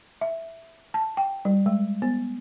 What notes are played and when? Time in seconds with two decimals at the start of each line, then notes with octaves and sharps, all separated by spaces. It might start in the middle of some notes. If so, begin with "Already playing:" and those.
0.21 E5
0.94 A5
1.17 G5
1.45 G3
1.66 G#3
2.02 B3